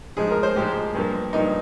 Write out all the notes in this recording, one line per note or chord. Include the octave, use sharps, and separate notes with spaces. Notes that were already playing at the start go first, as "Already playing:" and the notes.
G#2 F3 G#3 G#4
A#4
C5
G#2 F3 G#3 G4
G2 F3 A#3
G2 F3 A#3 D#4